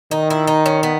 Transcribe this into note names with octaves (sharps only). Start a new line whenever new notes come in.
D#3 D#4
E4
D#4
C#4
B3